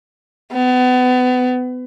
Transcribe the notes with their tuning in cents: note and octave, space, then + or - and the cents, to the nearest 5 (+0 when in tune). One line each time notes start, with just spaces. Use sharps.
B3 +30